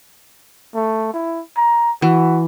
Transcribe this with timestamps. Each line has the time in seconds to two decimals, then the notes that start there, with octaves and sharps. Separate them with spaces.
0.75 A3
1.14 E4
1.56 A#5
2.02 E3 F#4